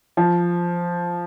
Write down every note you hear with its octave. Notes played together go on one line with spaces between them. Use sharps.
F3